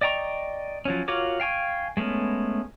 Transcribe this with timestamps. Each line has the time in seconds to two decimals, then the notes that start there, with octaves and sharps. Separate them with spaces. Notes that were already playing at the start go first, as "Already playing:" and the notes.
0.01 D5 D#5 G5 A#5 C#6
0.85 F3 F#3 C#4
1.08 F4 F#4 A#4 C#5 D6
1.40 F5 G5 G#5 C#6
1.97 G#3 A3 B3 C#4